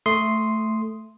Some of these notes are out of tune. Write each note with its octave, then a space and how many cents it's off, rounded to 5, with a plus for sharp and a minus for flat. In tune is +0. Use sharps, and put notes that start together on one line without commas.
A3 +0 C6 +0 D#6 +0